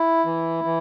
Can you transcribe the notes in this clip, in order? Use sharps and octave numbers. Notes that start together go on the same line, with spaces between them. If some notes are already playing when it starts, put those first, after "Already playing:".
Already playing: E4
E3
E3